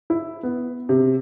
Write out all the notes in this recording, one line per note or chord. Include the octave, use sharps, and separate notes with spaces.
E4
B3
C3